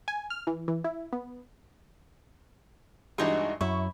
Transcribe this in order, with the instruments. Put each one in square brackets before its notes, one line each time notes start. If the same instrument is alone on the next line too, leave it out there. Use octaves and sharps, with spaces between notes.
[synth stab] G#5
F6
E3
E3
E4
B3
[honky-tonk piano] G2 E3 D4 [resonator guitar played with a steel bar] G#3 D#4 F#4
[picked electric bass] F#2 [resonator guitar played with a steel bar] E4 [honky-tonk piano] C#6